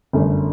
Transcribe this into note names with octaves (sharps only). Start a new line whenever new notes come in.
G1 F#2 D3 A3